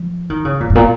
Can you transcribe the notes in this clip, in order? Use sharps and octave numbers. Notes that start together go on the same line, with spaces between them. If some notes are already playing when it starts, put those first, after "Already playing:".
Already playing: F3
D#3
C#3
A#2
G#2
A#2